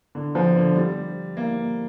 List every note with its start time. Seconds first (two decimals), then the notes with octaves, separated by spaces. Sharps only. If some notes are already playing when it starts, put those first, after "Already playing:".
0.15 D3
0.35 F3
0.56 D3
0.76 G3
1.37 A#3